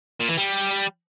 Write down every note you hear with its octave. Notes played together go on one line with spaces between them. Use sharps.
A#2
E3
G3